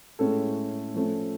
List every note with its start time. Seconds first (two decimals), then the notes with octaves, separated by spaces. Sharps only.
0.19 A2 G#3 C#4 A4
0.94 F3 A3 C#4